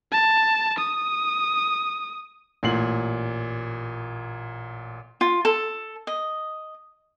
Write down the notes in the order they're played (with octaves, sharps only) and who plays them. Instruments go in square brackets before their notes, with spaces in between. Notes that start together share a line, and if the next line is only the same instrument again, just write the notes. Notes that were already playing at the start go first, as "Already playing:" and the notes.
[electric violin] A5
D#6
[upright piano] A1 A#2 C7 F#7
[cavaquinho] F4
A4
D#5